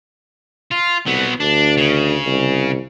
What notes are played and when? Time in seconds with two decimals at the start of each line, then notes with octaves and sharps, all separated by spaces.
0.71 F4
1.06 C2 F#3 B3
1.40 D2 D4
1.77 C#3
2.26 C2